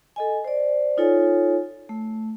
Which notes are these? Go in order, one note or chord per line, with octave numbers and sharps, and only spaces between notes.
A4 D#5 G#5
C5 D5
D#4 F4 A4 C#5 G#5
A3